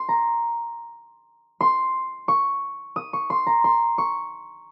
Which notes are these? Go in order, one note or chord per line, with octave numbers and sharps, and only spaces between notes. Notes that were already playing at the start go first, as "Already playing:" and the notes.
Already playing: C6
A#5
C6
C#6
D#6
C#6
C6
A#5
C6
C#6